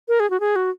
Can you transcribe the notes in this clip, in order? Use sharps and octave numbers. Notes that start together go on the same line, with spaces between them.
A#4
G#4
F#4
G#4
F#4